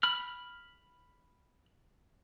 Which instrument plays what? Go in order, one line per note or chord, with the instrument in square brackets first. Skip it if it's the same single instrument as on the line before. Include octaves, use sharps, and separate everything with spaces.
[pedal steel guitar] B5 F6